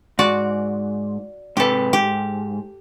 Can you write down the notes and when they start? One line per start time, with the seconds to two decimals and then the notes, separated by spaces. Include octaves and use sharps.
0.19 G#2 F#4 D5
1.57 G#2 C3 G4 A4 B4
1.93 G#2 G4